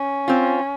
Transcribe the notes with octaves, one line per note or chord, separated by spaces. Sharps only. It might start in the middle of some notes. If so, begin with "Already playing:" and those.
Already playing: C#4
C4 F4